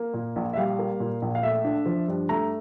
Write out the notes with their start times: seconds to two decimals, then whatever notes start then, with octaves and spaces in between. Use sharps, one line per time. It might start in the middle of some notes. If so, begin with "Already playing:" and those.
Already playing: A#3
0.14 A#2
0.36 A#1
0.53 E5
0.57 G3 F5
0.79 A#3
1.00 A#2
1.22 A#1
1.35 F5
1.43 A3 E5
1.64 D4
1.86 F3
2.08 G2
2.29 A3 A#5